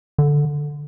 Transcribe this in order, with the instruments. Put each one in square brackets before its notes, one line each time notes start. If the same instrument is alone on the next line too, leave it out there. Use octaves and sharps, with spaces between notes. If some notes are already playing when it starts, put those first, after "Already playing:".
[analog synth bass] D3